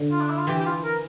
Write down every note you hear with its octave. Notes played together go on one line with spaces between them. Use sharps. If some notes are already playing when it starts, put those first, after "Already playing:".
Already playing: D3
F4
D4
E4
F4
E3 G4
G4
F4
A#4